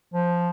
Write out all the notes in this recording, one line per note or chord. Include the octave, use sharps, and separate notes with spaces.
F3